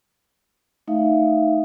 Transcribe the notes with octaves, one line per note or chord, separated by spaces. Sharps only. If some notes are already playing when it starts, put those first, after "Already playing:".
A3 D#4 E5 F5